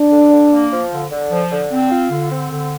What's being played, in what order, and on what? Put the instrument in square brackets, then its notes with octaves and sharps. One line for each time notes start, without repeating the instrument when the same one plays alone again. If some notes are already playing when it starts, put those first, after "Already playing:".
Already playing: [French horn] D4
[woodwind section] D3
D3
A#3
F3
D3
D3
F3
D3
C4
F4
D3
C4
D3